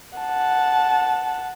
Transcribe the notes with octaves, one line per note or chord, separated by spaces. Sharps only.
F#5 A5